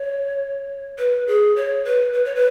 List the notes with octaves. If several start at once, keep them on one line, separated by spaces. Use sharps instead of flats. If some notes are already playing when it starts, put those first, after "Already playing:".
Already playing: C#5
B4
G#4
C#5
B4
B4
C#5
B4